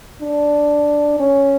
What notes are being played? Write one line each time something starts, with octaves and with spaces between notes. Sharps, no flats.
D4
C#4